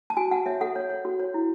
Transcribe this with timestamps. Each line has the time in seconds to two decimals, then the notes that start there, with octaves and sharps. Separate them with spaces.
0.10 A5
0.17 F#4 G#5
0.31 F#4 F#5
0.46 C#5 E5
0.61 A4 F#5
0.76 C#5
0.90 C#5
1.05 F#4
1.19 C#5
1.34 E4